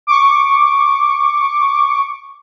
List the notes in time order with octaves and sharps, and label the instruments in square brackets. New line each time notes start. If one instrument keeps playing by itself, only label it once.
[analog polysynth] C#6 D6